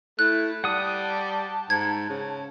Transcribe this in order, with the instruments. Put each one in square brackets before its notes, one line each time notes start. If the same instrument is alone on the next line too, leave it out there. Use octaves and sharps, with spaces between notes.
[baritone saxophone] A3 [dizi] E4 [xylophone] F#6
[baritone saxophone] G3 [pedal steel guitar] F#5 D#6 [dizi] A5
[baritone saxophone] G#2 [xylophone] G#6
[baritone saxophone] C#3